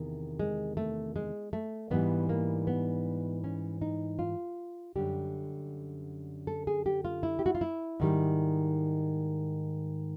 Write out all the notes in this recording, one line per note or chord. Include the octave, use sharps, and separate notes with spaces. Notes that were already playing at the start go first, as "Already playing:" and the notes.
Already playing: E2 C3 D#3
G#3
A3
G#3
A3
G#2 E3 G3 B3
A#3
B3
C#4
D#4
F4
F#2 D3 G3 G4
A4
G#4
G4
F4
E4
G4
F#4
F4
E4
G#2 D#3 G3